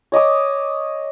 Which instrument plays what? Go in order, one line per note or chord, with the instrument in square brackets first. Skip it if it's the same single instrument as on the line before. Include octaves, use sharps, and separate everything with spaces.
[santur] C#5 D#5 D6 D#6